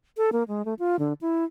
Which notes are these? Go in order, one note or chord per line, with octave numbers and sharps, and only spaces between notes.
A4
A#3
G#3
A3
F4
D3
E4